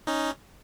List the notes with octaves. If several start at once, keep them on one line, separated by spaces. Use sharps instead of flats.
C#4 D#4